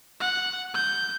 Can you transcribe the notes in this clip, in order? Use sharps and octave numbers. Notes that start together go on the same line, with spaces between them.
F#5
G6